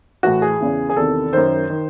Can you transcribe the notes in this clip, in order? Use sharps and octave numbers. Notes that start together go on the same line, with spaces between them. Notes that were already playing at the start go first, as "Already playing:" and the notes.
A2 E3 F#4
G#4
E2 C#3 E3
G#4
E2 C3 D#3 A4
F#2 D#3 C5
D#3